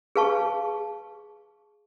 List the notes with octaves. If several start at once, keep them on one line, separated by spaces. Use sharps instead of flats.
G#4 B4 F5 A5 C#6